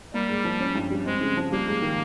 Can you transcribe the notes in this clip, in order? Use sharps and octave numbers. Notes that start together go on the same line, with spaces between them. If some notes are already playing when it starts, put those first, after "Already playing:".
G3 A#3
G#2
F3
C#4
G2
G3
G#3 C4
C#3
F3
G3 A#3
G#2
D#3